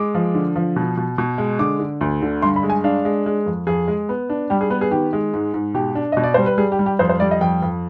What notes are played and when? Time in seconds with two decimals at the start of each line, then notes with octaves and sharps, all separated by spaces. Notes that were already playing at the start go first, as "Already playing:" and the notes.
Already playing: G#3 D6
0.15 F3
0.34 D3
0.56 F3
0.76 B2
0.97 B2
1.18 B2
1.38 G#3
1.59 D3 D6
1.80 D3
2.01 D2
2.22 D3
2.42 G2 C6
2.56 B5
2.63 G#3
2.70 G#5
2.84 D4 F5
3.05 G#3
3.26 G#3
3.46 F2
3.67 F2 G#4
3.88 G#3
4.09 B3
4.30 D4
4.50 G3 G4
4.61 G#4
4.70 B3 B4
4.81 G#4
4.91 D#3 G4
5.13 G#3
5.34 G#2
5.54 G#2
5.74 B2 G4
5.95 D4
6.12 B2 D#5
6.23 D5
6.34 G3 C5
6.46 B4
6.58 G3 G#4
6.72 G4
6.79 G3
6.86 G4
6.99 F2 C5
7.09 C5
7.20 G3 D5
7.31 D#5
7.41 F2 G5
7.62 F2